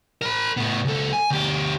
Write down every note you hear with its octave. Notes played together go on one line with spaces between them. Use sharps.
A#4 B5
A2 B3
C#2 A4
G#5
D2 G4